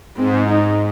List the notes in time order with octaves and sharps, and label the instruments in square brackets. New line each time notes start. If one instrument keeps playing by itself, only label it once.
[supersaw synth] G#2 [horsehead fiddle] C4
[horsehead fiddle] D#4